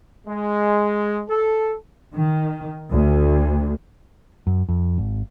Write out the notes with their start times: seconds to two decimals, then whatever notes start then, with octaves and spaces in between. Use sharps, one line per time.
0.27 G#3
1.29 A4
2.15 D#3
2.91 D2
4.47 F#2
4.69 F2
4.98 G#1